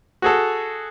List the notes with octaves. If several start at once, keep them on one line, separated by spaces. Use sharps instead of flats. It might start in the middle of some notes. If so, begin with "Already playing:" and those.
F#4 G#4 A4